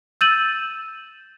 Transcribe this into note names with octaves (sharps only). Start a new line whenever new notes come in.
E6 G6 A6 D#7 E7 F#7